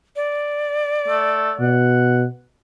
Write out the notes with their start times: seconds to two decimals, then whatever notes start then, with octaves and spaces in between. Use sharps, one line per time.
0.16 D5
1.08 A3
1.60 B2 F#5